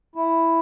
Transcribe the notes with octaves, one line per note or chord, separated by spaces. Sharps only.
E4